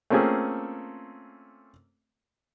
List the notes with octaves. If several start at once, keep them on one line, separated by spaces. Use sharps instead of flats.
A3 A#3 C4 C#4 F4 G#4